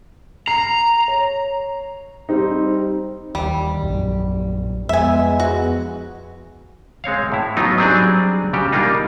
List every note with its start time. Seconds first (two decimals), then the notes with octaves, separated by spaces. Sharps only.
0.48 A#5 C7
1.08 C#5
2.29 G3 C4 D#4
3.35 D#2 G3
3.81 A#1 F#2
4.89 F2 G#3 B3 E5 G#5
5.40 F#4
7.04 G#3 C4 C#5 F5
7.32 A2 E4
7.57 F#3 B3 D#4 F4
7.78 F#3 G3 C4 D4 G#4
8.53 C#3 G3 F#4 G4
8.72 G3 A#3 D4 D#4 F4